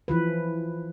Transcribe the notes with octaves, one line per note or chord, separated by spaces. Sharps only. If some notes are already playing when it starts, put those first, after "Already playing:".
E3 F3 B4